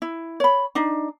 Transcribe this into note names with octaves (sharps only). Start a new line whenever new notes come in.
E4
C#5 B5
D4 D#4